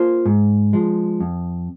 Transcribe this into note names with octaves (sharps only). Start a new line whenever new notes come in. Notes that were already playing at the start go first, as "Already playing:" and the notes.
Already playing: A#3 F4 C5
G#2
F3 G#3
F2